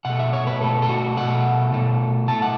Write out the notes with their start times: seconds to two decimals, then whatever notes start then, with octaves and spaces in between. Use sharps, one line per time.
0.05 B2 A3 F#5
0.19 E5
0.33 C#5
0.47 B4
0.61 B2 A3 A4
0.82 A4
0.89 F#4
1.17 B2 A3 F#5
1.72 B2 A3
2.28 A2 A3 A5
2.42 F#5